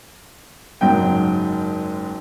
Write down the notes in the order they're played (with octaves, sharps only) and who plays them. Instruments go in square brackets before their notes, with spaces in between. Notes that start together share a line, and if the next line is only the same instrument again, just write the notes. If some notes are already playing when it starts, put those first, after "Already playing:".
[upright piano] F#1 G#2 F#3 G5